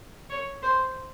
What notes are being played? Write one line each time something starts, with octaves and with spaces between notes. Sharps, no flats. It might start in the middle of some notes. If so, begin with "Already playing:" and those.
C#5
C5